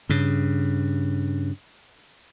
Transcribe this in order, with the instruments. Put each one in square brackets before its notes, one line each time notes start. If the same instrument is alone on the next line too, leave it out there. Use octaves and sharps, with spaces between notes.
[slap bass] G2 C#3